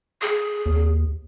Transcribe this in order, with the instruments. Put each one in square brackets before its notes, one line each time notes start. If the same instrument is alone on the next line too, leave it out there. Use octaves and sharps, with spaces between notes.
[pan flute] G#4
[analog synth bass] D#2